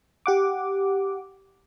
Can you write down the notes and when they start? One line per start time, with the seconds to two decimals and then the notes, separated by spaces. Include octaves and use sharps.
0.26 G4 F#5 D6